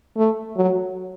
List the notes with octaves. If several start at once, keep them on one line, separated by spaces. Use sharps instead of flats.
A3
F#3